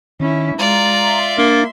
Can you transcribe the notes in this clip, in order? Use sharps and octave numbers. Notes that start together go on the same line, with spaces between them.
D#3 C#4 E4
G#3 F4 D5 A#5
E5 C6
A#3 D4 A6